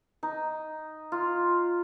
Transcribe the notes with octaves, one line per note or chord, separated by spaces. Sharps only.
D#4
F4